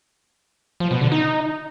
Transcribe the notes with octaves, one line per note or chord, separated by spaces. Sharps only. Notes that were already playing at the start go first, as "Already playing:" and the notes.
F3
B2
D3
D#4